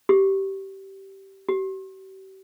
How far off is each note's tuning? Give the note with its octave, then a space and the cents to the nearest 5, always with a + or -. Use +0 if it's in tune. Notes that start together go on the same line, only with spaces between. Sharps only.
G4 -15
G4 -45